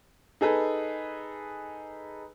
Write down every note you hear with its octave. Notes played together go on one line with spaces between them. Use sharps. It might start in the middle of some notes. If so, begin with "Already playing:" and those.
D#4 G#4 A4 B4